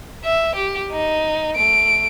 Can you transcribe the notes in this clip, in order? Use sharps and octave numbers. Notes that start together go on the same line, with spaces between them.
E5
G4
D#4
A3 D7